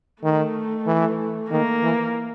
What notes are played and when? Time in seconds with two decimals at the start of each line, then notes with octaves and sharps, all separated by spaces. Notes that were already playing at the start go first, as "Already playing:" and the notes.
0.23 D#3 A3
0.86 E3
1.50 D#3 A#3
1.82 E3